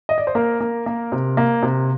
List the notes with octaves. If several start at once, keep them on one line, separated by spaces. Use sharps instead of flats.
D#5
D5
C5
A#3 A#4
A#3
A#3
C3
A#3
C3